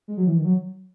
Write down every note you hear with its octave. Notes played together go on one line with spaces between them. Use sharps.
G#3
F#3
E3
D#3
F#3